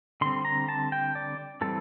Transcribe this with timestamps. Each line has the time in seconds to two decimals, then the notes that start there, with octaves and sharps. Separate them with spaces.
0.21 D3 G3 C4 C6
0.45 A#5
0.69 A5
0.92 G5
1.15 D5
1.61 E3 G3 C4 A4